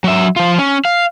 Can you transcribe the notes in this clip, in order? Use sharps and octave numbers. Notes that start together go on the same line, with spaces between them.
F#3 E5
F3 F4
C#4
F5